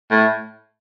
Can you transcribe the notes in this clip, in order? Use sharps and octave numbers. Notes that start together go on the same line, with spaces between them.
A2